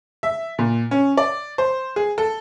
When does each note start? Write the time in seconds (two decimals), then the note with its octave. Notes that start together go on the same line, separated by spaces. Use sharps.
0.23 E5
0.59 A#2
0.91 C#4
1.17 D5
1.58 C5
1.96 G#4
2.18 A4